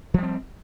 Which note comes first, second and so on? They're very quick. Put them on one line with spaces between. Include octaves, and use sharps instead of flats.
F3 G3 C4